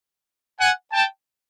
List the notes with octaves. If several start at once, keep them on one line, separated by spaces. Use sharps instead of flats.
F#5 G#5
G5 A5